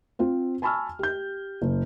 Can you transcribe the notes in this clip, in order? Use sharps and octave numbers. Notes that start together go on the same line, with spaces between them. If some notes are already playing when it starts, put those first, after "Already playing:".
C4 F4 C5
G#5 A5 B5 C#6 E6 F6
G4 G6
F#1